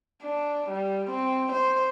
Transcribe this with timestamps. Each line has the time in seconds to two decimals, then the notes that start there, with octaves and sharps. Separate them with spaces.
0.22 D4
0.70 G3
1.10 C4
1.52 C5